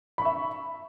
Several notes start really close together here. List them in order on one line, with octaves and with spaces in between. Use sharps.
B5 C#6 E5